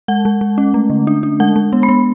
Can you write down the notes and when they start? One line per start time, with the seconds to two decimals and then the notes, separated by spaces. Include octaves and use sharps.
0.08 G#3 F#5
0.25 G#3
0.41 G#3
0.58 C#4
0.74 A3
0.90 D3
1.07 D4
1.23 D4
1.40 G#3 F#5
1.56 G#3
1.73 B3
1.83 B5
1.89 B3